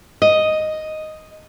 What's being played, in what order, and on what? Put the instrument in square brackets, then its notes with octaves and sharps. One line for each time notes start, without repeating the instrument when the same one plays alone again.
[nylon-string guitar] D#5